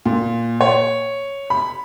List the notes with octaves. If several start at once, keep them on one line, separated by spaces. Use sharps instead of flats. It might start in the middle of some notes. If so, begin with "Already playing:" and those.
A#2
C#5
B5